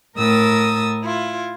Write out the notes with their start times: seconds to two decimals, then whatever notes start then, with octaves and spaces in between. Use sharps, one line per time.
0.16 A2 A#4 D#6 E6 A6
1.03 E4 F4